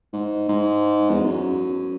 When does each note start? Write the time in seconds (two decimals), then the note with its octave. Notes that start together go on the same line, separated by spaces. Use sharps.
0.13 G#2
0.49 G#2
1.10 E2
1.20 F#2